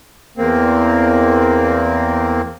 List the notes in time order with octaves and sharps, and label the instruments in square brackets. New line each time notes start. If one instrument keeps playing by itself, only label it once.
[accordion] E2 A#3 C4